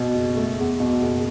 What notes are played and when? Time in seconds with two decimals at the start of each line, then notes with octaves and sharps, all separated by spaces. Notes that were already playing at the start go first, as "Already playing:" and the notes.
Already playing: B2
0.15 F#1
0.37 A3
0.59 E2
0.80 B2
1.02 F#1